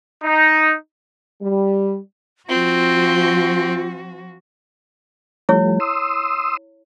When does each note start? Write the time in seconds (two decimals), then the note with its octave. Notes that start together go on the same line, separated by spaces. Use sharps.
0.23 D#4
1.42 G3
2.49 F3 C4 F4 F#4
5.49 F3 G3 A3 E4 C#5
5.80 C6 D#6 E6